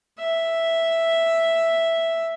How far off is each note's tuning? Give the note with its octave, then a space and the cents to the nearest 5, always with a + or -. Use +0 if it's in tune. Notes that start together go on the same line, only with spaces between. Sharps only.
E5 +0